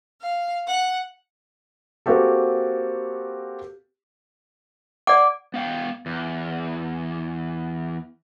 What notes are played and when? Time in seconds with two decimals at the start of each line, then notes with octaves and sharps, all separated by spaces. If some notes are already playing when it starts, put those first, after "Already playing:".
0.20 F5
0.66 F#5
2.06 A#3 C4 F#4 G4 A4
5.07 D5 F#5 D6
5.54 B3 F5 G5
6.06 E2